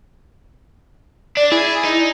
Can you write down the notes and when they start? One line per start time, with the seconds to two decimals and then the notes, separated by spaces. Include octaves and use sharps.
1.37 D4 D5
1.52 E4 G#4
1.85 D#4